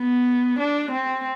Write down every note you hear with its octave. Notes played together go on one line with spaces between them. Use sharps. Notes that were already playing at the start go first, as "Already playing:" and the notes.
Already playing: B3
D4
C4